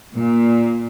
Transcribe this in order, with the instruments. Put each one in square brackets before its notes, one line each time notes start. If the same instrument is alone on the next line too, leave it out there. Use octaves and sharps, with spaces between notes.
[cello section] A#2